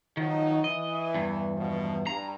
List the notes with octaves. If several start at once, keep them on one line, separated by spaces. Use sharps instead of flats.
D#3 F3 F#3 D#4
E3 D#5
E2 G2
B2 F3
G2 A#5